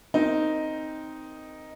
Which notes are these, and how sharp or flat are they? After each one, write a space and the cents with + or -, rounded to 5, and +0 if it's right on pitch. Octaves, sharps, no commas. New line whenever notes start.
C4 +0 D#4 +0 A#4 +0